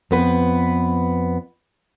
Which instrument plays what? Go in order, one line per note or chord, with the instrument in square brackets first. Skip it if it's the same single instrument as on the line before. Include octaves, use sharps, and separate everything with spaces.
[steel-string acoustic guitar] F2 B3 B4